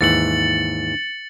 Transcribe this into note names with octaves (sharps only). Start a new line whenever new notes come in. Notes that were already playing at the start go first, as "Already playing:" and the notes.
D#2 G#2 E3 A6 C#7 F#7